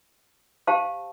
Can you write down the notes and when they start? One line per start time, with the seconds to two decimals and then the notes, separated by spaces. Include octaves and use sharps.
0.67 G4 C5 F5 A5